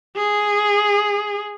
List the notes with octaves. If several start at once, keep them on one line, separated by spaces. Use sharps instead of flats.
G#4